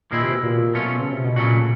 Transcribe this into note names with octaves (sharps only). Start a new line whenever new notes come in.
A#2 D#3 G#3 C4 E4
C3
B2
A#2
B2 F#3 A3 C#4 F4
C#3
C3
B2
A#2 C#3 F#3 A3 C#4 F#4